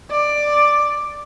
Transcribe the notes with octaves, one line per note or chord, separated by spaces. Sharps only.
D5